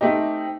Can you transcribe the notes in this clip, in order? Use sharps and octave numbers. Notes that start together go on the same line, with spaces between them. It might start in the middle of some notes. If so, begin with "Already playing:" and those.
A3 C4 D#4 G4